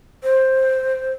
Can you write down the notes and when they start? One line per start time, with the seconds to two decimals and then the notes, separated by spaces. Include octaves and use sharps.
0.23 C5